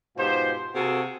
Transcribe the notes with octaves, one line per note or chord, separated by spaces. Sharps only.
G#2 B2 F4 G4 C5
C3 A#3 F#4 G#4 A4